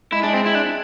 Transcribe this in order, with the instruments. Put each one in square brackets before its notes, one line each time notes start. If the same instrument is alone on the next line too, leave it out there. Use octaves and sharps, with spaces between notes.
[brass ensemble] G#3 [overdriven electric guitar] E4
[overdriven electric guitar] D4
C4
E4
D4